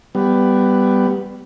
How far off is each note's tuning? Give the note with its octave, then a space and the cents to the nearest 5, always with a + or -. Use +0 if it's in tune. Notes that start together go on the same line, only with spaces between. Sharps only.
G3 +0 B3 +10